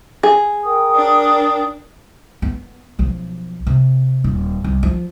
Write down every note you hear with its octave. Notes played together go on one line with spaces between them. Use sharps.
G#4
A#4 G5 D#6
D4
B3
B1 F3
C3
D#1
C2
F3